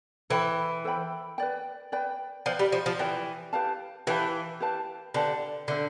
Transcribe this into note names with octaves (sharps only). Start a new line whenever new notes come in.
E3 A4 C5 G5 B5
A4 C5 G5 B5
B4 D5 G5
B4 D5 G5
F3 B4 D5 G5
G3
F3
F3
E3 B4 D5 G5
G4 B4 F5 A5
E3 G4 B4 F5 A5
G4 B4 F5 A5
D3 G4 B4 F5 A5
D3 D4 A4 C5 E5